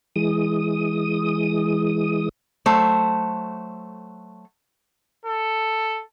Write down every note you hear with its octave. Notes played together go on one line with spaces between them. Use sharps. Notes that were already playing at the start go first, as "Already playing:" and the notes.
E3 G#3 D#6
F#3 A3 C5
A4